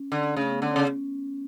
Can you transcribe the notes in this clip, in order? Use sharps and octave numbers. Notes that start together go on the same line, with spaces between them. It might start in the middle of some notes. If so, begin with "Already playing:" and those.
Already playing: C#4
D3
C#3 A3
B3
D3 C#4
C#3